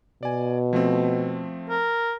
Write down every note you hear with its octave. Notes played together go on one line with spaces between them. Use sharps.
B2 D5 G#5
F3 A3 C4
A#4